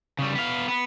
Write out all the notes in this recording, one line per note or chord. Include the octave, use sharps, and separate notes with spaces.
C#3 G3
B3 F5
B3